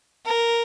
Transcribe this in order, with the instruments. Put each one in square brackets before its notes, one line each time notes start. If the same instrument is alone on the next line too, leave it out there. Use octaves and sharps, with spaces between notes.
[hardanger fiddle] A#4